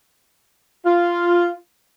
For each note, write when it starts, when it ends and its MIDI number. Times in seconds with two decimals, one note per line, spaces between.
0.84 1.52 65